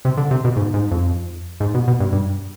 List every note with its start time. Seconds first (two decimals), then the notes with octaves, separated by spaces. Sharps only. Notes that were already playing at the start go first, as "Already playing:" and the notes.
0.05 C3
0.17 D3
0.31 C3
0.45 B2
0.56 G#2
0.74 G#2
0.91 F2
1.60 G#2
1.75 B2
1.88 B2
2.00 G2
2.12 G2